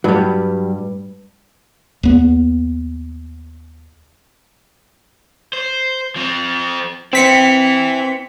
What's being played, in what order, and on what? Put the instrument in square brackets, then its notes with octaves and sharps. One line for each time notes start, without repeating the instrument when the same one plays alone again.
[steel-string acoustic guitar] G2 [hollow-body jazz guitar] F#3 G3
[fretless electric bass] D#2 B3
[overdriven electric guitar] C5
F3 C4
[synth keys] C4 B6 C#7 [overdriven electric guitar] E4 B4